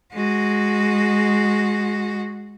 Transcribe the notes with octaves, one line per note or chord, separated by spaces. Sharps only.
G#3 F#4